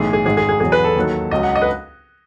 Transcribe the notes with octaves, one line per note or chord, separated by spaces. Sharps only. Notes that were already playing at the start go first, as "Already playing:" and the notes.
Already playing: B1 A2 E3 G#4
G#4
G#1 G#2 D#3 G#4
G#4
G#4
E2 B2 F#3 G#4
B4
A4
D#2 D#3 F#3
C#2 C#3 F#3 D#5
F#5
D#5
B4